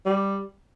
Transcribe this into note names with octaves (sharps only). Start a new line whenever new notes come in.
G3